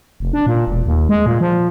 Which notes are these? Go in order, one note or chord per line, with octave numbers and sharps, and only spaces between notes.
F1
D4
A#2
E1
D#2
G#3
A#2
F3